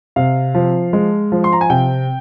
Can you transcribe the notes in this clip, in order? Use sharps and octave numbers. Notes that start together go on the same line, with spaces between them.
C3 F5
F3
G#3
F3
C6
A#5
G#5
C3 G5